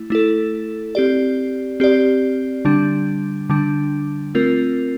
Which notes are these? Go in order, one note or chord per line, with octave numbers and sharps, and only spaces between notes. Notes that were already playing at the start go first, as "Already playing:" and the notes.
Already playing: A3 E4
A3 E4 A4
C4 G4 D5
C4 G4 D5
D3 G3 D4
D3 G3 D4
A3 C4 F4 A#4